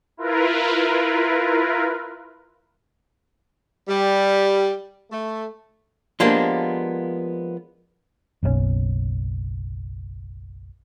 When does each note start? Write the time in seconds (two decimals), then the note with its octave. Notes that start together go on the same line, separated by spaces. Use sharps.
0.17 E4 F4 A#4 B4
3.88 G3
5.11 A3
6.20 F3 G#3 A#3 B3 D4 G4
8.43 F#1 B1 C#3 C#4